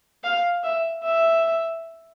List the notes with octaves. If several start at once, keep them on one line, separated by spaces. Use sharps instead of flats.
F5
E5
E5